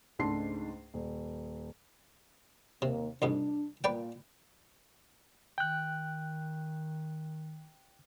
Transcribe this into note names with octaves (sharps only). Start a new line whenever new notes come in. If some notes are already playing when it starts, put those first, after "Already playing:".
C#2 G#2 A3 D4 C6 C7
D#1
D#2 C3 A#3
C2 F2 G#2 D4
A#2 B4 D5 G5
D#3 G5 F#6